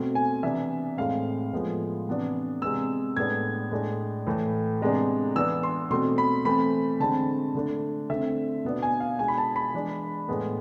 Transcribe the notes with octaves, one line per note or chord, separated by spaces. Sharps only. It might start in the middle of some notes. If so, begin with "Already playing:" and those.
Already playing: B2 A3 C4
G#5
C3 E3 B3 D4 E5
A2 G#3 C4 F5
A2 F3 G#3 B3
C3 E3 B3 D4
C3 G#3 B3 E6
A2 G#3 B3 D4 G#6
A2 G#3 D4
A2 E3 A3
C3 G#3 B3 D4
E3 B3 D4 E6
C6
B2 A3 C4 C6
B5
E3 A3 C4 B5
D3 G#3 C4 A5
D3 A3 D4
D3 A3 C4 E5
B2 B3 D4
G#5
F5
B2 G#3 D4 G#5
B5
A5
B5
E3 G#3 D4
A2 G#3 B3